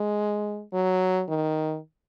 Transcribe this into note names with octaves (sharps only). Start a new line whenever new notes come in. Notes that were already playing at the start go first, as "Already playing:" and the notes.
Already playing: G#3
F#3
D#3